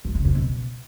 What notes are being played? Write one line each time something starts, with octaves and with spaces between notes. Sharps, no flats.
G#2
C#3
F2
B2